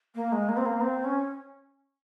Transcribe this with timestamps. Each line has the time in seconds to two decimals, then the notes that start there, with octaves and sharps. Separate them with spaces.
0.15 A#3
0.32 G#3
0.48 A#3
0.57 C4
0.65 A#3
0.81 C4
1.04 C#4